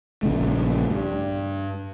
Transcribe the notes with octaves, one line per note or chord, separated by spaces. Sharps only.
A#1 C#3 A3
G2